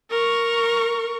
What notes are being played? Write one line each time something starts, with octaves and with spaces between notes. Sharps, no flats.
A#4 C#6